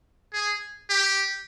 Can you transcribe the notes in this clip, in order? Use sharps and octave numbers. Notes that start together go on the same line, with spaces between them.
G#4
G4